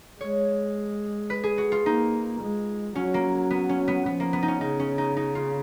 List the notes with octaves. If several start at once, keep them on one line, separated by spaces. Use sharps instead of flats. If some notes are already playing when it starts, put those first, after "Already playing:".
G#3 C#5
B4
G#4
F#4
F4
A#3 D#4
G#3
F#3 C#4
A#3
B3
C#4
B3
F3 B3
A#3
B3
D#4
C#4
C#3 D#4
C#4
D#4
D#4
F4